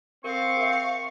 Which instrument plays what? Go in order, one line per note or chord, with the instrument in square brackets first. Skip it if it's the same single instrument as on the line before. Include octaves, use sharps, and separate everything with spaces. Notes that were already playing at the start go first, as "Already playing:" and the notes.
[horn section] C4 [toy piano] A#4 [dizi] F5 [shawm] C#6
[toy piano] G#4 A#4 E5